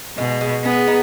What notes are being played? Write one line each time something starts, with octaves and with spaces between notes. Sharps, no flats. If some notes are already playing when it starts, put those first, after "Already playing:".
B2 G#3
G#3
B3 G#4
D#4